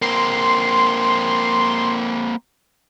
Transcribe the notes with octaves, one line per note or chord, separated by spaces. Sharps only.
A#3 C4 C6